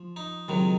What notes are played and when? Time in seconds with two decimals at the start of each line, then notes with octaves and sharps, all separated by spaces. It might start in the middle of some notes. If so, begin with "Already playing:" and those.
Already playing: F3
0.16 D#4
0.48 C#2 C3 D#3 F#3